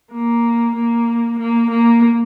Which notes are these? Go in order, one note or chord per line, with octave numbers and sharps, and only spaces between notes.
A#3
A#3
A#3
A#3